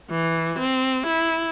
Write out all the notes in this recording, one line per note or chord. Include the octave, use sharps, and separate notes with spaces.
E3
C4
E4